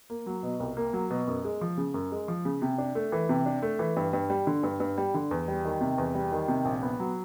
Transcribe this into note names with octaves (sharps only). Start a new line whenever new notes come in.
A#3
F#3
B2
C2
A#3
F#3
B2
F#2
G#3
F3
C#3
F#2
G#3
F3
C#3
C3
D4
A3
E3
C3
D4
A3
E3
G2
G2
G3
D3
G2
G2
G3
D3
E2
G3
D#3
C3
E2
G3
D#3
C3
A#1
B3
F#3